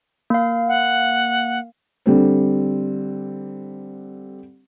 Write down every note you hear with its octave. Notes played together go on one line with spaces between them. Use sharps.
A#3 F5
F#5
D3 G3 C4